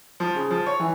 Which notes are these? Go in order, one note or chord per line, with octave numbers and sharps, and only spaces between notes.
F3
C#3
F3
C#5
E3